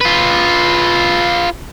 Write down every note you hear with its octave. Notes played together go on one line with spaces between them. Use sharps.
F4 B4